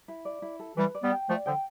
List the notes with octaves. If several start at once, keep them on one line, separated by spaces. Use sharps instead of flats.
E4
D5
E4
A4
E3 G3 B4
D5
G3 B3
G5
F3 A3 D5
D3 F3 G5